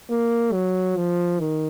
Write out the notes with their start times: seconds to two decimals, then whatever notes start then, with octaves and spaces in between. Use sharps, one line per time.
0.10 A#3
0.52 F#3
0.97 F3
1.39 D#3